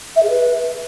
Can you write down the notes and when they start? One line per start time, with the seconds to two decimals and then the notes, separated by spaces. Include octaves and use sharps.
0.16 E5
0.22 G#4
0.29 B4